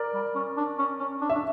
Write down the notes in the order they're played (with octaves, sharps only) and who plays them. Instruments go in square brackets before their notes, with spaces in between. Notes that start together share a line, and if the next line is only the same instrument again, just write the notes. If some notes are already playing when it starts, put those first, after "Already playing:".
Already playing: [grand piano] A#4 D5
[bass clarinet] G3
C#4
D4
C#4
C#4
D4
[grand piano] E5
[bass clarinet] D4